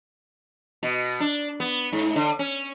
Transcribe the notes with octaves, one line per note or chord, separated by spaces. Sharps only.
B2
D4
B3
G#2
D3
C#4